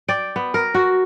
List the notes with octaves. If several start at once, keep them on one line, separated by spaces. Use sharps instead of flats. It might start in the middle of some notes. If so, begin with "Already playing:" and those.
D5 G5
B3
A#4
F#4